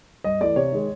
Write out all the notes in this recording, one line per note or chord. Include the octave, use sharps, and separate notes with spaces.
G2 D#5
E3 A3 D5
C3 C#5
D#3 G#3